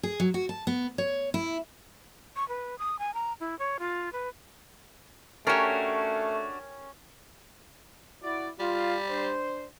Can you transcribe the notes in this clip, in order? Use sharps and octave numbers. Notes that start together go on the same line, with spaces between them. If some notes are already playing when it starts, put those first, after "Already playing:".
G#4
F#3
F#4
A5
B3
C#5
E4
C#6
B4
D#6
G#5
A#5
E4
C#5
F4
B4
A3 C#4 D4 F#4 G4 A#4 C#5
E4 F#4 D5
G3 F4
D4 C5